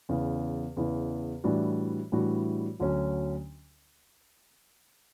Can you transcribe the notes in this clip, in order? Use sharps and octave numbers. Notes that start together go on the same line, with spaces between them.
E2 C#3 E3
E2 C#3 E3
A2 E3 G3 D4 F#4
A2 E3 G3 D4 F#4
D2 D3 F#3 C#4